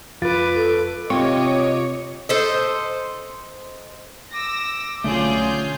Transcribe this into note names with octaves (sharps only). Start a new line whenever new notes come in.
F2 F4 B4 D6 A6
A4
C3 C4 F4 C#5 D#5 D6
A4 C5 D#5
D6 E6 A#6
B1 D3 A3 C#4 F4 G#4 C6 G6